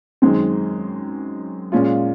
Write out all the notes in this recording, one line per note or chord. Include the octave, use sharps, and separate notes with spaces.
F#2 D#3 G#3 C4
A#2 G#3 C#4 F4